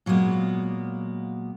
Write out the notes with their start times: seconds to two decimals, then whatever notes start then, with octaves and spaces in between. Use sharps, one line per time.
0.06 A#2 F#3 G#3 A#3 B3